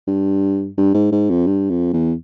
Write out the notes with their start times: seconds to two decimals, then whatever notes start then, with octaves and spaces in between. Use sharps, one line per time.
0.07 G2
0.78 G2
0.94 G#2
1.12 G#2
1.30 F2
1.47 G2
1.70 F2
1.93 E2